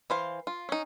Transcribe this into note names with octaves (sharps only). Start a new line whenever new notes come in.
E3 C5 F5
F4
C#4 D#4